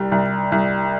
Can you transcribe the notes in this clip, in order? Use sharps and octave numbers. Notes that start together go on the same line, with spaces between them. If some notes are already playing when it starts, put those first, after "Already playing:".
Already playing: C2 G3
C2
C2